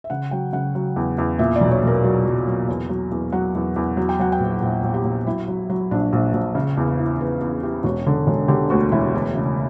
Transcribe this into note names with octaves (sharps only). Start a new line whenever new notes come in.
E5
C#3 F#5
F#3 G5
C#3 F#5
F#3
E2
E2
A#2 E5
D5
B1
C#5
B1 A#4
F#3
F#3
F#3
E2
F#3
E2
F#3 F#5
E2
E2
F#3
G5
F#3 F#5
G5
A#1
A#1
A#1
G4
A#1
F#3 E4
F#3
F#3
A#1 D4
A#1
A#1
C#3
E2
B4
E3
E2 B4
E2 B4
E3 G4
E1 F#4
D3
E1
D3 G4
D2 F#4
E1 E4
E2
C#3